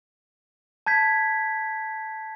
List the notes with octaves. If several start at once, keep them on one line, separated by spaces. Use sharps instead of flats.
A5 G6 G#6 B6